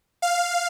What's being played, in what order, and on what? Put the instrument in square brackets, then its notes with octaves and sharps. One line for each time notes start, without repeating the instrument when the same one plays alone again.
[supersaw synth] F5